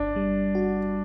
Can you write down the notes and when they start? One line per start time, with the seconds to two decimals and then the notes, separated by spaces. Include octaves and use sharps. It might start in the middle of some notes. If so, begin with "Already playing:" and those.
Already playing: G1 D4
0.16 G3
0.55 F#4